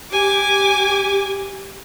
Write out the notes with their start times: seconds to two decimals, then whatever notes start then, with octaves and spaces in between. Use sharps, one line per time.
0.12 G4 G#5 D6